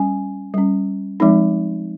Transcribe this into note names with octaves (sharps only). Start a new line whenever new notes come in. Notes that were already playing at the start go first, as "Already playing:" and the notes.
Already playing: G3 C#4 G#5
G3 C#4
F3 G#3 C4 D#4